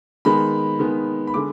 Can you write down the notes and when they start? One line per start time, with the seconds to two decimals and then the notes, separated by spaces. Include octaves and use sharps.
0.25 D#3 G#3 B3 B5
0.79 D#3 G#3 B3
1.27 B5
1.34 D3 G#3 D6